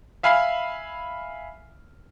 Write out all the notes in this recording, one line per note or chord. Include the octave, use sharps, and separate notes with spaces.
E5 F5 G#5 B5 F6 C7